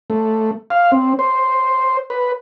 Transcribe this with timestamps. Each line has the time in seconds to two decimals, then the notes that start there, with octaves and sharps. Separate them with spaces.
0.10 A3
0.70 F5
0.92 C4
1.19 C5
2.10 B4